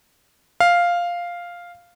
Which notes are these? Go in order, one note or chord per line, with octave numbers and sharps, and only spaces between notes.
F5